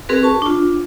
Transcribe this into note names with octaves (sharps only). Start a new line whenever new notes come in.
C4 F#4 G#4 A#4 B4
A5 C#6
D4 F4